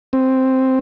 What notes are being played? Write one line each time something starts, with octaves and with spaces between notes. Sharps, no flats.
C4